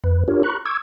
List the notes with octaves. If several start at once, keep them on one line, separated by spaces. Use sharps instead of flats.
F2 B4
D4 F4 G4 A#4 C#5
A#5 B5 C#6 F#6
C#6 D6 E6 G#6